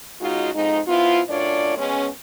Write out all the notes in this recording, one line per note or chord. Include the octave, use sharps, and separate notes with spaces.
C#3 G#3 D#4 F4 F#4
F2 G#2 G#3 D#4
F3 B3 E4 F4
F#2 A2 D4 F4 C#5 D5
B2 G#3 C#4